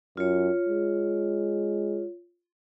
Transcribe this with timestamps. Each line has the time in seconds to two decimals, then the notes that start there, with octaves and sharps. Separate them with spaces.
0.17 F#2 F4 C#5
0.69 G#3